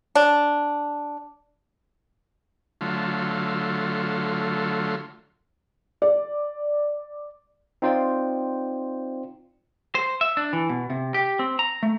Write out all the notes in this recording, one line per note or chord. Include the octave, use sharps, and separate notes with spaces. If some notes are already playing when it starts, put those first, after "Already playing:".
D4
D3 F#3 A3 F4
D5
C4 D#4 F4 C5 D5 G5
C5
E5
D4
E3
B2
C3
G4
C4
A#5
A3